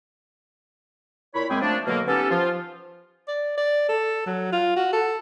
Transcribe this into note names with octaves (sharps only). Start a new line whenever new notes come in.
A#2 E4 C#5 B5
F#2 G#3 A#3 C4 G#4 G5
F3 A3 A#3 D4
B2 D3 F#3 A#3
B3 C#4 D#4 G4 A4
F3 F4
D5
D5
A4
F#3
F4
F#4
A4